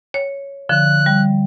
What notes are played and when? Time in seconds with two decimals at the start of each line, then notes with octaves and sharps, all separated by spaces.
0.14 C#5
0.69 D3 F3 F#6
1.06 G3